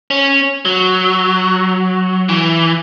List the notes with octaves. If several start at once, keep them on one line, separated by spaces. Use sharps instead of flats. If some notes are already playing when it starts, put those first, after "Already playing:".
C#4
F#3
E3